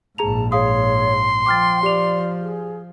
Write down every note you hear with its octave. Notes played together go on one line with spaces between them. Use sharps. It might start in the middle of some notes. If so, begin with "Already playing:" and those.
A#1 G#2 G#4 A5 A#5 F7
G#4 C#5 F5 C6 D#6
F3 G5 D6 F6 A6
G4 D5 F7
G#4